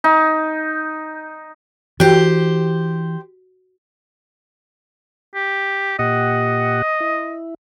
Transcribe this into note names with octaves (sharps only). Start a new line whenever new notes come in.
D#4
E3 F#4 G4 C5 G5
G4
A#2 G4 D#5 F#5
E4